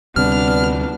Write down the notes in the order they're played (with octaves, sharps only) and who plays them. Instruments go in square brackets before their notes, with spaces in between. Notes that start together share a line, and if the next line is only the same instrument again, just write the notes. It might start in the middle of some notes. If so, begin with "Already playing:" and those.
[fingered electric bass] D2 C3 G3 [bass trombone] B3 [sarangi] D4 [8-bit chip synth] F6